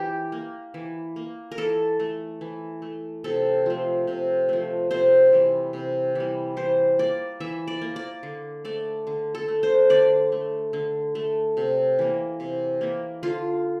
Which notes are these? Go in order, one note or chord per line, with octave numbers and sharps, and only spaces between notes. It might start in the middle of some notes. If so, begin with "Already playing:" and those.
Already playing: E3 G4
A#3
E3
A#3
A#4
E3 A4
A3
E3
A3
C3 A4
F3 A3
C3
F3 A3
C3 C5
E3 G3
C3
E3 G3
E3 C5
A#3 D5
E3 E5
D5
A#3
D5
D3
A3 D5
D3
A4
A3
C5
D3 D5
A3
D3
A3
C3
E3 A#3
C3
E3 A#3
D3 F4